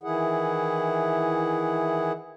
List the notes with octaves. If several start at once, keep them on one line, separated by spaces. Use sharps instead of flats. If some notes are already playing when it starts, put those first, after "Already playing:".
D#3 E3 E4 G#4 F#5